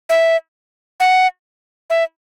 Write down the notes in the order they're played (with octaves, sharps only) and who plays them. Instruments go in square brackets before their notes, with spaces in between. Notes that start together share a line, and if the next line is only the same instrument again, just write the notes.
[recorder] E5
F#5
E5